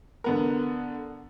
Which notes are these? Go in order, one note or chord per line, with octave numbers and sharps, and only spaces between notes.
D3 B3 A#4